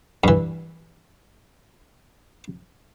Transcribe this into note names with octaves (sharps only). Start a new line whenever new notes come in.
G2 E3